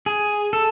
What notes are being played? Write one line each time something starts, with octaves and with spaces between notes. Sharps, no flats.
G#4
A4